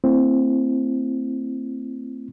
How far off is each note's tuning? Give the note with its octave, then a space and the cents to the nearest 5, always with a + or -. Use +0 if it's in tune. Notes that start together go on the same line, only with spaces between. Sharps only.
A3 +45 C4 +0 E4 +30